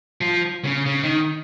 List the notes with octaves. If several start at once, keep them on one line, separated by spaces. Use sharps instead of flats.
F3
C#3
C#3
D#3